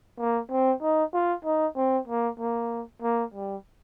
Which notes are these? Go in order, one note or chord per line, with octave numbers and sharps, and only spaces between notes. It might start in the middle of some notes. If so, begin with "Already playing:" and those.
A#3
C4
D#4
F4
D#4
C4
A#3
A#3
A#3
G3